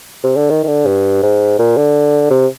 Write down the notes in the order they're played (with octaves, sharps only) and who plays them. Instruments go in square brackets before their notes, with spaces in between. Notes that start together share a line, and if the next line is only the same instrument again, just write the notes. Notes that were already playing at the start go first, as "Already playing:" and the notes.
[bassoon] C3
D3
D#3
D#3
D3
G2
G#2
A#2
D3
C3